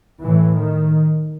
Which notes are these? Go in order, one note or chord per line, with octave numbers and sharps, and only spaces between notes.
A2 E3
D#3